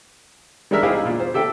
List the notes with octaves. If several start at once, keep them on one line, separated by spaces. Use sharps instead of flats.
G3 G#3 D4 A#4 E5
D#4 E4 G4 G#4 C5 F5
A#2
C5
G4 A4 E5 G5